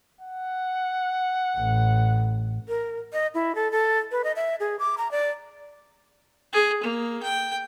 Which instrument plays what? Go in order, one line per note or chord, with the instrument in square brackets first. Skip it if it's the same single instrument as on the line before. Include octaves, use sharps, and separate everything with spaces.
[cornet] F#5
[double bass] A1
[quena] A#4
D#5
E4
A4
A4
B4
D#5
E5
G#4
D6
A#5
D5
[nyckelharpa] G#4
A#3
G5